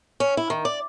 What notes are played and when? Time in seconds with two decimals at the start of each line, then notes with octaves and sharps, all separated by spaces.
0.20 C#4
0.37 E4
0.50 D#3
0.65 D5